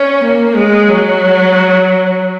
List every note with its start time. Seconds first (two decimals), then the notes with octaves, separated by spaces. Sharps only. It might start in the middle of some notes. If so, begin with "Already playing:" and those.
Already playing: C#4
0.24 A#3
0.56 G#3
0.88 F#3